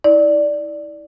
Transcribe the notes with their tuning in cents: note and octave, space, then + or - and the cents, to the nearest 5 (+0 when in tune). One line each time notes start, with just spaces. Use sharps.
E4 -40 D5 +0